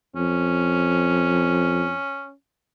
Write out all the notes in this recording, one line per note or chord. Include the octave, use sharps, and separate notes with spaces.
F2 C#4